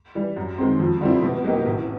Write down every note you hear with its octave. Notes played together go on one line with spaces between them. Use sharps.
E3 G3
F#2
D#3 G#3 C4
F2
D3 G3 C4 E4
B2
F#3 A#3 D#4 G4
A1